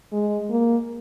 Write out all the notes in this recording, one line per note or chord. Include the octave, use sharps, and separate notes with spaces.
G#3
A#3